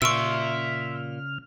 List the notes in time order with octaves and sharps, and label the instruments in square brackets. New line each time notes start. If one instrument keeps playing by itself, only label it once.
[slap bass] A#2 [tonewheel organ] C#3 F6 [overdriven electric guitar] E5 C6 [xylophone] C#6 E6